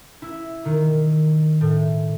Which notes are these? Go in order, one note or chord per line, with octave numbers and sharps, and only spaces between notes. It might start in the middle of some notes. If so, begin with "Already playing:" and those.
E4
D#3
A2